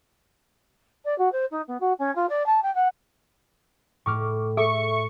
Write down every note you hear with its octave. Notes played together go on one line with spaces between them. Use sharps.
D5
F#4
C5
D#4
B3
F#4
C#4
F4
D5
A5
G5
F#5
A2 C#6 D6 F6
G#4 A4 E5 C#6